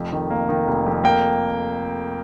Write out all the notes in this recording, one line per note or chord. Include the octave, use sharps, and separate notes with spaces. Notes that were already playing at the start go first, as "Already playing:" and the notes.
Already playing: F1 F2
D#3
A#3
D#3
F1
F2
A#3 G5